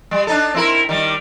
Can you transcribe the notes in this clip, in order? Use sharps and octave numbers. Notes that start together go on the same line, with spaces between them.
G3
D4 D#4 A4
C4 E4 A#4
D#3 G3